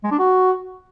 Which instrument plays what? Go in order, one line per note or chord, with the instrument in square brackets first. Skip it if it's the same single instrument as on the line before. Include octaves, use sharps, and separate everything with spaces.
[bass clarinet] G#3
D4
F#4